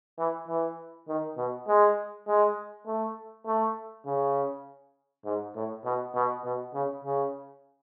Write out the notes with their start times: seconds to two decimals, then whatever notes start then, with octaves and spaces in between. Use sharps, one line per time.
0.19 E3
0.48 E3
1.08 D#3
1.37 B2
1.68 G#3
2.27 G#3
2.87 A3
3.46 A3
4.06 C#3
5.25 G#2
5.55 A2
5.85 B2
6.15 B2
6.44 B2
6.74 C#3
7.04 C#3